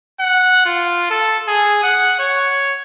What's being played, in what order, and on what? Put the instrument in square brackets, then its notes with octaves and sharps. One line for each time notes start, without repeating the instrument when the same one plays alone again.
[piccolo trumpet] F#5
F4
A4
G#4
F#5
C#5